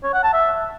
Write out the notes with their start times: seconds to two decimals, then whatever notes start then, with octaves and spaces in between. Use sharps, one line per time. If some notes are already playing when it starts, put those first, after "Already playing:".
0.04 C#5
0.14 F#5
0.23 A5
0.33 E5